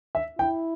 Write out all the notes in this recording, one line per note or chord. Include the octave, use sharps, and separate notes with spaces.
E5
E4 G5